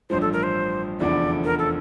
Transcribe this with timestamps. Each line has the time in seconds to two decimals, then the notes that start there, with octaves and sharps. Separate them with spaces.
0.10 A1 G2 F3 C5
0.21 A4
0.33 A#4
0.43 C5
1.00 F1 E2 D3 F3 D5
1.44 A#4
1.59 A4